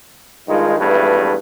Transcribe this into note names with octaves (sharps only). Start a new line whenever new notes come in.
G2 D#3 G#3 D#4 F4
G#1 E2 G2 A3 B4